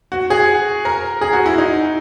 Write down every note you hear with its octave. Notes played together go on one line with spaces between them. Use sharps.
F#4
G#4
A#4
G#4
F#4
E4
D#4